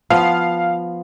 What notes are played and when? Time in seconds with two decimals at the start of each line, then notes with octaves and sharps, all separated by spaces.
0.10 F3 B3 F5